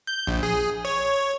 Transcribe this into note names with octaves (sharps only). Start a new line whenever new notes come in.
G6
A#1
G#4
C#5